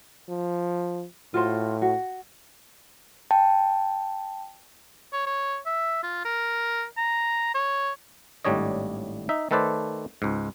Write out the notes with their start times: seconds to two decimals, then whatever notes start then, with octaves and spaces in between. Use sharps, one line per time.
0.29 F3
1.34 A2 F4 F#4 C5
1.82 F#4
3.31 G5 A5
5.13 C#5
5.27 C#5
5.66 E5
6.03 F4
6.25 A#4
6.98 A#5
7.55 C#5
8.45 G#1 A2 G3 D4 C#5 D#5
9.29 D#4 E5
9.51 D#3 A3 A4 B4 C5 D5
10.22 C#2 G#2